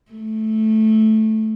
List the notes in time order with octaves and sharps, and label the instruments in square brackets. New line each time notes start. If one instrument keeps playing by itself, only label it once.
[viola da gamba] A3